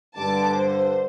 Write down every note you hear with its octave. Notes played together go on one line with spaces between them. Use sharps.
G2 D3 A5 D6
C5